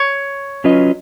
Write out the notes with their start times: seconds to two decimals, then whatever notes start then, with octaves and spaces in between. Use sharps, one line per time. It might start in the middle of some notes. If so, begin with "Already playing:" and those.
Already playing: C#5
0.64 F#3 C#4 F4 B4 D#5